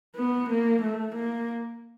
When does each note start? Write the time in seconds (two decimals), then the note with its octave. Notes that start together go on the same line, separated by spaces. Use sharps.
0.16 B3
0.49 A#3
0.82 A3
1.15 A#3